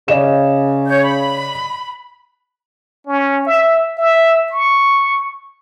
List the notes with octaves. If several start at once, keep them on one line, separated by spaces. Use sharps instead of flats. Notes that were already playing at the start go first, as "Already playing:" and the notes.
C#3 D5 D#5 E7
C#5 G6
B5
C#4
E5
E5
C#6